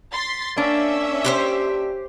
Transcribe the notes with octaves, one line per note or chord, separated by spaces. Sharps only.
C6 A6 B6
A#3 C#4 D4 E5
G4 B4 C5